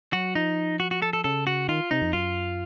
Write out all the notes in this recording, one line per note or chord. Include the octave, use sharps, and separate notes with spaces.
F#3 F#4
F3 D#4
F#4
F#4
A4
A4
C#3 A4
F#4
D#3 F4
C3 D#4
F2
F#2 F4